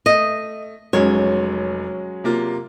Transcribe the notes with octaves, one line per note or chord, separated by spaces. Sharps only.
A3 D#5
F1 F#3 G#3 C#4 C#5
C3 A#3 F4